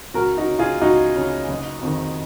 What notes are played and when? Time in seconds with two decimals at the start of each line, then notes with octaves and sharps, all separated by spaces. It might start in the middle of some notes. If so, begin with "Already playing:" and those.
0.14 C#2 F#4 A#4
0.37 D#4 F#4
0.48 C#3
0.59 F4 G#4
0.81 C#2 D#4 F#4
1.15 C#3
1.48 F#1
1.81 F2 D#3